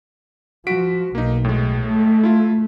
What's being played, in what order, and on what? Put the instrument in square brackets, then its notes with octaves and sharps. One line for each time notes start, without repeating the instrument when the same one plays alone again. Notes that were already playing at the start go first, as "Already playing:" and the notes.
[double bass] F3 [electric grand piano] F#4 B6 D7
[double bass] B1 [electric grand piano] A#3 D#4
[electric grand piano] A2 G#3
[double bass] A3
[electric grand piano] E4 F4